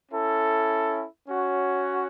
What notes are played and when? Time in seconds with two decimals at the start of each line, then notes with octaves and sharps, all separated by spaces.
0.12 C#4 E4 A4
1.29 C#4 F#4 C#5